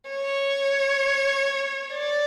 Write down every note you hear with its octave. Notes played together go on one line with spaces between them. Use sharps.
C#5
D5